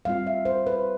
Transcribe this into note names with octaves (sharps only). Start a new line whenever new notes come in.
G3 C4 F4 F5
E5
C5
B4